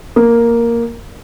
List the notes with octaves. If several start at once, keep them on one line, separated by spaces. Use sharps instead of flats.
A#3